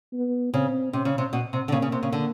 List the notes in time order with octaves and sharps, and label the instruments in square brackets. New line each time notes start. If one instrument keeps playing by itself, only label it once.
[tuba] B3
[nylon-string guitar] C#3 [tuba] C4
[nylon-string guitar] C3 [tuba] C#4
[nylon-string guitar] C#3
C3
B2
C3
D3
[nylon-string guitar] C#3 [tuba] A#3
[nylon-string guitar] C#3
C3
C#3
D3